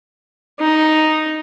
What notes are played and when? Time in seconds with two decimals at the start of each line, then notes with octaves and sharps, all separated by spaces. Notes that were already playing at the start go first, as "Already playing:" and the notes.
0.60 D#4